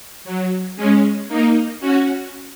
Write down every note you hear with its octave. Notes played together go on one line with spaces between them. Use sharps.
F#3
G#3 C#4
A#3 D#4
C#4 F#4